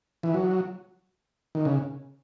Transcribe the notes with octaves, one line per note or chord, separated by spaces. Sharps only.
E3
F#3
D#3
C#3